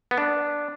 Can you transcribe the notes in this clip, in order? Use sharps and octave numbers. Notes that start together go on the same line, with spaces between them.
B3
D4